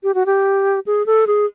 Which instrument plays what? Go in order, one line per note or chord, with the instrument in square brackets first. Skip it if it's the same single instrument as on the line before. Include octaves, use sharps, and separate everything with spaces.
[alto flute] G4
F#4
G4
G#4
A4
G#4